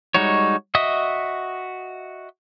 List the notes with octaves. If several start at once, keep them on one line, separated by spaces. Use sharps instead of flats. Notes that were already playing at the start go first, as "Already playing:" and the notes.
G3 G#3 D#4 F#4 C#5
F#4 D#5 E5 D#6